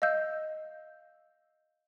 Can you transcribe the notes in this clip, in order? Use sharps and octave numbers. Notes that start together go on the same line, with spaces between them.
D#5 F5 E6 G6